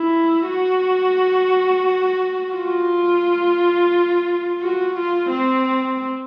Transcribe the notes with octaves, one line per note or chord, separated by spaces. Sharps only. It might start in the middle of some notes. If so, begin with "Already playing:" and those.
Already playing: E4
F#4
F4
F#4
F4
C4